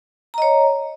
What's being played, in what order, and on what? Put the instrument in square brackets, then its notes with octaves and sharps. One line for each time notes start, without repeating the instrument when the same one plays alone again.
[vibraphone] A#5
D#5
C#5